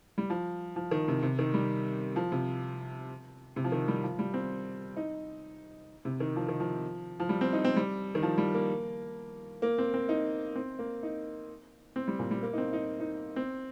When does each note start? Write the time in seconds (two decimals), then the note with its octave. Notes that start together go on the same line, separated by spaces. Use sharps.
0.18 G3
0.30 F3
0.76 F3
0.91 D#3
1.08 C3
1.23 C3
1.39 D#3
1.54 G3
2.16 F3
2.32 C3
3.56 C3
3.64 F3
3.72 D#3
3.88 G3
4.03 F3
4.19 G3
4.34 C4
4.97 D#4
6.05 C3
6.20 D#3
6.36 F3
6.48 D#3
6.60 F3
7.20 F3
7.29 G3
7.41 C4
7.53 D#4
7.65 C4
7.76 G3
8.15 D#3
8.23 F3
8.38 G3
8.54 A#3
9.62 A#3
9.78 C4
9.94 C4
10.09 D#4
10.55 C4
10.79 A#3
11.03 D#4
11.96 C4
12.08 G3
12.19 A#2
12.31 G3
12.43 A#3
12.53 D#4
12.58 C4
12.73 D#4
13.00 D#4
13.36 C4